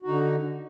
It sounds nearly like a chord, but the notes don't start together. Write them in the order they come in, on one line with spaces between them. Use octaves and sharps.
F#4 D#4 D3